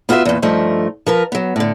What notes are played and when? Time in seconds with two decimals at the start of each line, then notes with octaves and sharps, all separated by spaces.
0.09 B3 F4 F#4 C#5 E5
0.25 E2 A#2
0.42 G2 F3 A3 D#4
1.06 F3 A#4 B4
1.32 F#3 B3
1.56 A2 D3